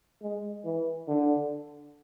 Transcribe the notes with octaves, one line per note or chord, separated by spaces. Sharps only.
G#3
E3
D3